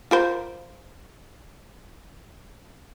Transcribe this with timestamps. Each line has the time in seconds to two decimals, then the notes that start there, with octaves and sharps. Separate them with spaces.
0.11 F4 A#4 C5